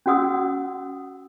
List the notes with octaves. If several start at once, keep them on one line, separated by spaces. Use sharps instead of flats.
C#4 F#4 F#5 D#6 E6